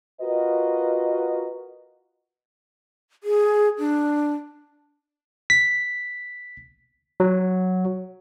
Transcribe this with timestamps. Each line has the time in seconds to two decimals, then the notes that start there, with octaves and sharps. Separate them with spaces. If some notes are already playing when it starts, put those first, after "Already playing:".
0.21 F4 F#4 A#4 B4 D#5
3.23 G#4
3.79 D4
5.50 B6
7.20 F#3